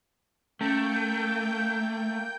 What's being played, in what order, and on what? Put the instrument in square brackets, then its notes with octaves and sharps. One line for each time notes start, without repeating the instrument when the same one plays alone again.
[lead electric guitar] A3 [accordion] A#3 G5 G6 [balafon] C#4